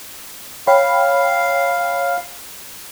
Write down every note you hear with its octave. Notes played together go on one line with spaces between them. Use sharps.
C#5 F5 G5 B5